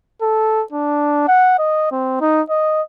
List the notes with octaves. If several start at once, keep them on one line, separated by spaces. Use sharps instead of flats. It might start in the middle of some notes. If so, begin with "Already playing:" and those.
A4
D4
F#5
D#5
C4
D#4
D#5